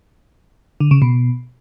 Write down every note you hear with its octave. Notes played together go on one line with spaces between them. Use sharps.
D3
C#3
B2